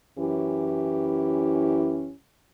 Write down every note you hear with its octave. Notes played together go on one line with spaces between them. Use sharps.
F#2 E3 C#4 E4 G4